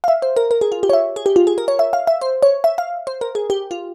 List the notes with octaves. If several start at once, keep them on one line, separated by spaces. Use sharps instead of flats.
F5
E5
C5
A#4
A#4
G#4
F4
G4
C#5
E5
G#4
G4
F4
G#4
A#4
C#5
E5
F5
E5
C5
C#5
E5
F5
C5
A#4
G#4
G4
F4